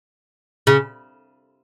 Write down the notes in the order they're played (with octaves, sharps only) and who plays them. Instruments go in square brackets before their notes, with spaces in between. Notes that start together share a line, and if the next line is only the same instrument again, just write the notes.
[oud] C#3